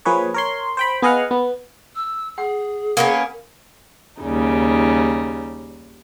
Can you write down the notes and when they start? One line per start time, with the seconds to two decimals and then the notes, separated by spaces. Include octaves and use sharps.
0.05 F3 A#3 G#4 B4 C#5
0.34 A#4 C#5 C6
0.77 C5 G5 B5
1.02 B3 G#4 D#5 F5 F#5 F6
1.31 B3
1.96 E6
2.38 G#4 F#5
2.97 A#3 B3 C#4 A#4 F#5
4.22 D#2 C#3 G3 D#4